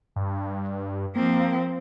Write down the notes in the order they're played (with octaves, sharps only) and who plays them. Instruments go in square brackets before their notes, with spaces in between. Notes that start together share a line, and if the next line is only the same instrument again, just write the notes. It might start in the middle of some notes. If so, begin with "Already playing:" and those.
[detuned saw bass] G2
[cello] F3 C4 [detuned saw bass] A#3